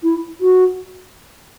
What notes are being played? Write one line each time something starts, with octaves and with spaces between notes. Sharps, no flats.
E4
F#4